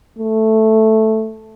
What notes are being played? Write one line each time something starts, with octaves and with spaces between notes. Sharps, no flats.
A3